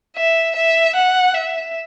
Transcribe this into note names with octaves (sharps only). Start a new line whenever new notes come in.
E5
E5
F#5
E5